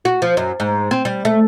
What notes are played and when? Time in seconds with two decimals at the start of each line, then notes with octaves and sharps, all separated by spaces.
0.05 F#4
0.22 F3
0.37 F#2
0.60 G#2
0.91 C4
1.05 G3
1.25 A3